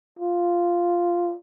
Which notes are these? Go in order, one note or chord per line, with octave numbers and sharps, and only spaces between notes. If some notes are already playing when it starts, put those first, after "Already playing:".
F4